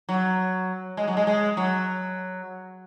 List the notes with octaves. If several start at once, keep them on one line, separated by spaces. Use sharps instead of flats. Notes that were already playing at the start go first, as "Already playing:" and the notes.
F#3
G#3
F#3
G#3
G#3
F#3